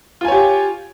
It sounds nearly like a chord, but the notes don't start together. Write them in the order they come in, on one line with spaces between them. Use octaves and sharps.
F4 G#5 C#5 G4